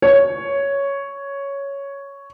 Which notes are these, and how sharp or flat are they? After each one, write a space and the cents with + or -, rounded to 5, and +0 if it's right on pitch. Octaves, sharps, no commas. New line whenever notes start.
C#5 +5